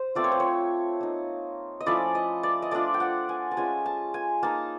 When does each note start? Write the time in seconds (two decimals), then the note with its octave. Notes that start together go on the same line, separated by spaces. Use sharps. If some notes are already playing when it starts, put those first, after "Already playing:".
Already playing: C5
0.15 A3 C4 F4 D5
0.24 C#5
0.32 C5
0.40 C#5
1.01 A#3 D#4
1.80 D#5
1.86 F3 A3 C#4 E4 D5
2.15 D#5
2.43 D5
2.62 D#5
2.71 A3 D4 F4 D5
2.94 G5
3.00 F#5
3.29 G#5
3.51 A5
3.57 G#3 C#4 F4 G#5
3.86 A5
4.14 G#5
4.43 A#3 D#4 A5